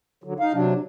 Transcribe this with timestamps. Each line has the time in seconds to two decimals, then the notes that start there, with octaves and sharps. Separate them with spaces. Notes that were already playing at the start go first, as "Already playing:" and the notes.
0.24 D3 F#3
0.40 D#4 F5
0.54 C3 F#3 D4